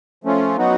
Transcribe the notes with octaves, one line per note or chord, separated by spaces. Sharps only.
F3 A3 C#4 F4
F#3 B3 D#4 F#4